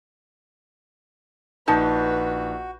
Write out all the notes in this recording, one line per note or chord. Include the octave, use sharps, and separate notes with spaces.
A#1 D#4 F#4 B4 A5 G6